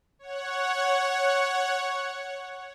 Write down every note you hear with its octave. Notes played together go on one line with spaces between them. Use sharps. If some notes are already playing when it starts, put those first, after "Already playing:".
C#5 F#5